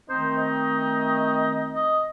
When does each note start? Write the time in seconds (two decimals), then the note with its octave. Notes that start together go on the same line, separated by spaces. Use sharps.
0.09 D#3 A3 C4 D#4 C5
0.36 D#5
1.73 D#5